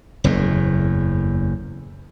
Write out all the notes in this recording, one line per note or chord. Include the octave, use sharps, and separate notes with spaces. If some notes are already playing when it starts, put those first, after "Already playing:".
F#1 E2 A2